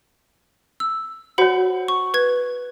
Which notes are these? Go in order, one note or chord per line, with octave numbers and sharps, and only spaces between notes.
E6
F#4 C5 C#5 F#5 B5
C#6
B4 G#6